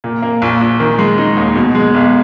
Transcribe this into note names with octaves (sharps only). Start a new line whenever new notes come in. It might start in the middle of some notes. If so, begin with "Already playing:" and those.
A#2
A#3
A#1
A#1
D#3
G#3
D#4
D#2
B2
G#3
B1